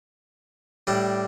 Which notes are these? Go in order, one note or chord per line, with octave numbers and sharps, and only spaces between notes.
A2 G3 D4